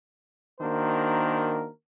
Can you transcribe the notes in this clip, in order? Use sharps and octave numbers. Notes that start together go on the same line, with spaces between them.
D#3 A#3 D4 F#4 A#4 C5